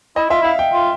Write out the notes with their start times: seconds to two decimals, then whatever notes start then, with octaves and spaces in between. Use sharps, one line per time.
0.16 E4 D#5
0.29 F4 E5
0.41 E4 F5
0.59 G5
0.73 F4